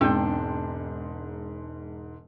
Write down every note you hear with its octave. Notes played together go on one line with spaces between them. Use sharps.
E1 G#2 C4 D4 G5 G6